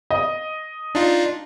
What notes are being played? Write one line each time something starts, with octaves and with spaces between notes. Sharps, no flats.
D#5
D4 D#4 F4